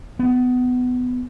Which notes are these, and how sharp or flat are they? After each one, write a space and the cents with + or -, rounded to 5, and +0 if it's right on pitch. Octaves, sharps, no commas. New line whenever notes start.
B3 +20